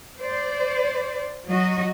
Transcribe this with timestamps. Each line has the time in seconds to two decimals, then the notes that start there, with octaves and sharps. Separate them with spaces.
0.19 C5 D5
1.49 F#3 F#4 D#5